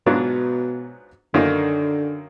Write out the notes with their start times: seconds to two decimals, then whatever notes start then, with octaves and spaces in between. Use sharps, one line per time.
0.06 G#2 B2 F#3 B3 D4 F4
1.34 F#2 D3 D#3 A#3 D#4